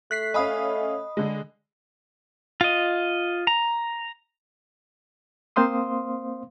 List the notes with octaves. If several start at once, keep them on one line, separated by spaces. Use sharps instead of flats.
A3 F#6 B6 C7
C#4 D#5 F5 G#5 B5 D#6
D3 G#3
F4 D#5
A#5
A#3 C4 C5 F5 C6 D#6